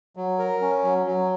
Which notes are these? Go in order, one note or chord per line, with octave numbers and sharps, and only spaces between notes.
F#3
A#4
C#4
F#3
F#3